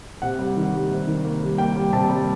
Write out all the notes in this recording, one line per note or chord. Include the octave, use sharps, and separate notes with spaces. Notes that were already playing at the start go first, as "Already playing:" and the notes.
C3 F#5
G3
D#3
G3
C3
D#3
A#3
G3
A#3 G5
G3
C3 A5
G3